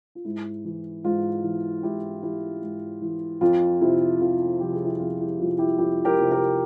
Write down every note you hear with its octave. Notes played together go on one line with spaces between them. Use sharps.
F4
G#2 E4
E3
G#2 F4
E3
G#2 E4 G4
E3 E4 G4
G#2
E3
F2 F4
C3 F3 E4
F2 F4
C3 F3 G4
G#4
E4 G4
F2 F4 G#4
E4 G4
C3 F3 F4
E4 G4
F2 E4 G4
G4 A#4
C3 F3
G4 A#4